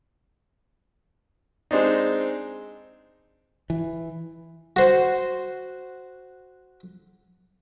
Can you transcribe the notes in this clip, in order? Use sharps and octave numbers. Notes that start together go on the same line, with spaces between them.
G#3 C4 D4 D#4
E3
F#4 C5